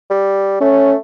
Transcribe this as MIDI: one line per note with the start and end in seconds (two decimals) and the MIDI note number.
0.10 0.57 55
0.61 0.98 57
0.61 0.93 61